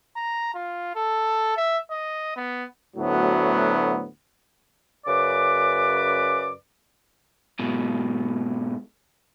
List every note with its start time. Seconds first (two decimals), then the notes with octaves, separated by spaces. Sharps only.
0.16 A#5
0.54 F4
0.95 A4
1.57 E5
1.91 D#5
2.36 B3
2.97 D2 A2 F#3 B3
5.06 F#2 C#3 B4 D5 D6
7.59 G#2 B2